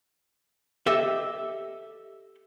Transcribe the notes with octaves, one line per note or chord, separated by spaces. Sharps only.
G4 A4 D#5 E5